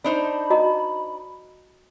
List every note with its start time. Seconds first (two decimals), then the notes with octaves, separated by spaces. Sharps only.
0.04 D4 D#4 C5 B5
0.50 F#4 D#5 A#5